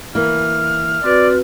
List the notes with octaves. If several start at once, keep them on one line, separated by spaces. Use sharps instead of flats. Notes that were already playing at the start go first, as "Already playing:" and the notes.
E3 A#3 F6
C4 F#4 B4 D5